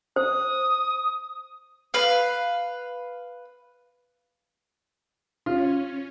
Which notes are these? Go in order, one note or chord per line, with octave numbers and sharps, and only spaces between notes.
C5 D#6
B4 F5
C#4 F4